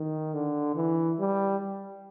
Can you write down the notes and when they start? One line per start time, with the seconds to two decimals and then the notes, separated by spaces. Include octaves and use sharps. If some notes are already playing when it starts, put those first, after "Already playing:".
Already playing: D#3
0.34 D3
0.76 E3
1.19 G3